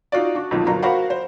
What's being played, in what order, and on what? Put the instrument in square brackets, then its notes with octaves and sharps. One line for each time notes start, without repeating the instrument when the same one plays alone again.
[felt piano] D#4 F4 F#4 D5
D4 F#4
B1 F2 A#2 D#3
G1 F#3 F4 A#4 A#5
F#4 A#4 C5 F5 F#5 B5
C5